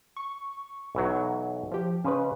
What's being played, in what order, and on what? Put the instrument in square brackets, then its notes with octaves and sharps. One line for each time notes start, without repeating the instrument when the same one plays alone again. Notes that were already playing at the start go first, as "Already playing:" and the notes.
[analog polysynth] C#6
[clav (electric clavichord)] B1 E3 F#3
[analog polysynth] F3 G4
[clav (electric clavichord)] C#3 C5 D#5 [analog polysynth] C#4 B4